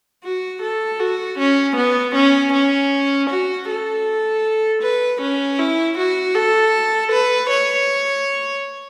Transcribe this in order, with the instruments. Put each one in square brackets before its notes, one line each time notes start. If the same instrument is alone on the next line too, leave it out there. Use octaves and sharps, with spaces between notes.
[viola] F#4
A4
F#4
C#4
B3
C#4
C#4
F#4
A4
B4
C#4
E4
F#4
A4
B4
C#5